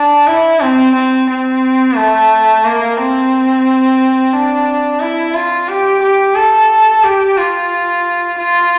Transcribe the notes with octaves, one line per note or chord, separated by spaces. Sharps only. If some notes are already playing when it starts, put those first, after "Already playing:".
Already playing: D4
E4
C4
C4
C4
A3
A#3
C4
D4
E4
F4
G4
G4
A4
G4
F4
F4